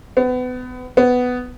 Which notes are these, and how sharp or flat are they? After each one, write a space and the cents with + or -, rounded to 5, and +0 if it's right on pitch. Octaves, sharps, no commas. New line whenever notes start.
B3 +30
B3 +10